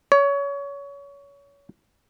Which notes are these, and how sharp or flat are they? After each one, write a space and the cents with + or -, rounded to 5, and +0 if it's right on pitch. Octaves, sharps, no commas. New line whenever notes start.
C#5 +25